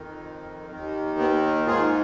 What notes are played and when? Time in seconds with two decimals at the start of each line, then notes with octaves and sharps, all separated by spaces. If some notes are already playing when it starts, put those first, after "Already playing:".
Already playing: F2 D#3
0.70 D#2 D#3
1.19 B3
1.67 G#2 D#3 F4 G#4